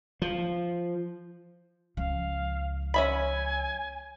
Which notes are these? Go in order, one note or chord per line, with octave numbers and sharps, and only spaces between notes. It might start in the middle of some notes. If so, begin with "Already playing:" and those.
F3
C#2 F3 F5
C#4 E5 G#5 B5